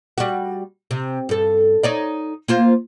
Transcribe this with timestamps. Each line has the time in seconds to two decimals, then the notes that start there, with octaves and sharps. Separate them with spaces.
0.18 G3 F#4
0.91 C3
1.29 G2 A4
1.83 D#4 C#5 D5
2.48 A#3 F4 C5